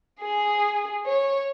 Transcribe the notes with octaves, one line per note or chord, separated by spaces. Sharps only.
G#4
C#5